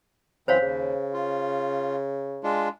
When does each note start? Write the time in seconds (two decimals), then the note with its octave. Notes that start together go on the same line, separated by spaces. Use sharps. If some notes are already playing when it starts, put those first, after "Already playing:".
0.48 F#2 E3 C4 C5 C#5 F5
0.62 D#2 C#3
1.14 F4
2.44 G#3 D4 F4